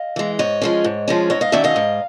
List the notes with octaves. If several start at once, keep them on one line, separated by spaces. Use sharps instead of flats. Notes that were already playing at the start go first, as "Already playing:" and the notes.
Already playing: D#5 F5
E3 G#3
G#2 C#5 D#5
F3 G#3 C#4
G#2
F3 G#3 C#4
G#2 C#5 D#5
D#5 F5
D#3 F#3 A3 C#4 D5 E5
D#5 F5
G#2